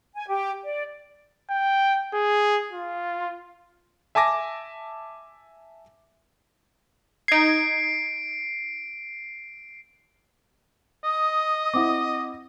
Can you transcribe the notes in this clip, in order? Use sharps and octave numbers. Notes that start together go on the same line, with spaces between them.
G#5
G4
D5
G5
G#4
F4
E5 G#5 A5 D6 A#6
D#4 G#6 C7 D7
D#5 D#6
C4 E4 F#5 D6